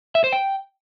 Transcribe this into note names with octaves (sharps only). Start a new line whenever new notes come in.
E5
C5
G5